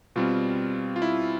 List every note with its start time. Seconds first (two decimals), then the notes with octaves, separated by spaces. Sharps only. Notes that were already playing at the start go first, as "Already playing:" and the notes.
0.16 B2 G3 C4 F4
0.96 F4
1.02 E4